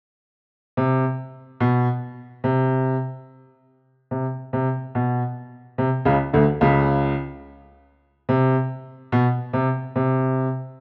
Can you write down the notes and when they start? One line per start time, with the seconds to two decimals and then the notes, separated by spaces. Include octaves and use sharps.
0.77 C3
1.60 B2
2.44 C3
4.11 C3
4.53 C3
4.95 B2
5.78 C3
6.05 C#2 C#3
6.33 D2 D3
6.61 C#2 C#3
8.29 C3
9.12 B2
9.53 C3
9.96 C3